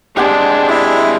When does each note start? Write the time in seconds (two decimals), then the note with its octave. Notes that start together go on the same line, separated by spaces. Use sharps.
0.17 C3 G#3 D4 G4 F#5 G#5
0.69 E4 E5